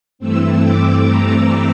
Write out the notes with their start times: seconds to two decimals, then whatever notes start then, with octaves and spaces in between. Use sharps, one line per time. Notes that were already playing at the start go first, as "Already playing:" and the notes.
0.19 G2 E3 A3 C4 E6
0.62 D6
1.05 A#5